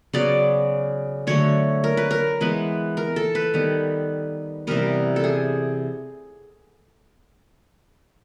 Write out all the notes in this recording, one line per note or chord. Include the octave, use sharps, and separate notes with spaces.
C#3 F#3 B3 D5
D3 F#3 A3 C#5
A#4
B4
A#4
E3 G#3 B3 B4
A#4
A4
B4
D#3 G3 B3
C3 E3 G3 B3 A#4
A4
G#4